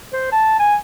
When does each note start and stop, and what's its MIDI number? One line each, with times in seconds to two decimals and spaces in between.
0.13 0.30 72
0.32 0.56 81
0.59 0.75 80